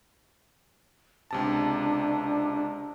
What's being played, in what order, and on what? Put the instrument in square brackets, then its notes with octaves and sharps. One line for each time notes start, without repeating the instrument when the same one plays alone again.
[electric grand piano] C#2 C3 A5 [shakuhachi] D4